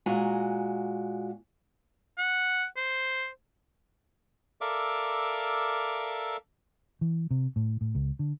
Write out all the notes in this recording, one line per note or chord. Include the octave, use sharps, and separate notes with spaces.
A#2 G#3 F#4 G#5 A#5
F#5
C5
A4 A#4 D5 E5 F5 D6
E3
C3
A2
A2
C#2
D3